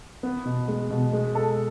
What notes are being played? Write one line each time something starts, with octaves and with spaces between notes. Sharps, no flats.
B3
B2
G#3
B2
G#3
A4